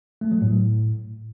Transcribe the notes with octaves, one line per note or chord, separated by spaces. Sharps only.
A3
F#3
A2